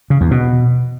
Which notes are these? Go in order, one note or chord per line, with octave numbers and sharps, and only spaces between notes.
C#3
E2
B2